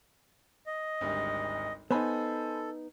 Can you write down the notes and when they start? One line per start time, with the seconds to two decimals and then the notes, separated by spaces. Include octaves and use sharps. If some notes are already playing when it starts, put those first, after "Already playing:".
0.66 D#5
1.01 G#1 D2 G3
1.91 B3 D#4 A4 C5 G#5 B5